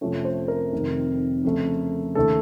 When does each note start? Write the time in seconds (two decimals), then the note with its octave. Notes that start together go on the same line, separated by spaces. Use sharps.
0.01 F2 C3 F3 A3 C#4
0.25 C5
0.48 A#4
0.73 F1 F2 C3 D#3
1.44 F2 C#3 A3
2.15 D#2 C#3 A3 A4